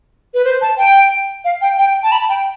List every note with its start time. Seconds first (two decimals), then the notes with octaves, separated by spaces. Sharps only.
0.34 B4
0.45 C5
0.62 A5
0.78 G5
1.45 F5
1.61 G5
1.78 G5
2.03 A5
2.12 B5
2.29 G5